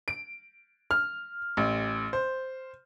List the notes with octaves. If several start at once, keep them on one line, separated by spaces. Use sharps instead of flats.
D7
F6
A1
C5